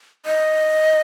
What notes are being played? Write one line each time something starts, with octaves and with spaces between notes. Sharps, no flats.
D#5